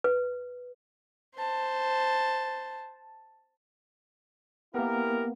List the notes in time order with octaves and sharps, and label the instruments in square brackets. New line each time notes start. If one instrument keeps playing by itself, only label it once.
[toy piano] B4
[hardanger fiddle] C5 A5
[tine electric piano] A#3 B3 [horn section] E4 G4 A#4